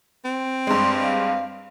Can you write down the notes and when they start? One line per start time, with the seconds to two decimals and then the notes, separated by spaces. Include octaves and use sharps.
0.25 C4
0.67 G2 G#3 C6
1.02 F5